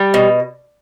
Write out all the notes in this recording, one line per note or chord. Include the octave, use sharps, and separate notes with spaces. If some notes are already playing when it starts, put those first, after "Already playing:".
Already playing: G3
B2